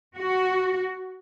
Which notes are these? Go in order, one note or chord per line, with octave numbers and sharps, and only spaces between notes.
F#4